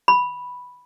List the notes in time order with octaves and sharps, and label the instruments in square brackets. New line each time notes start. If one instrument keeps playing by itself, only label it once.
[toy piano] B5